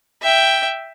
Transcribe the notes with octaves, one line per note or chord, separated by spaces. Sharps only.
E5 G5